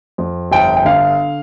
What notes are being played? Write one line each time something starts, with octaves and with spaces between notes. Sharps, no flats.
F2
G1 G5
G5
D3 F5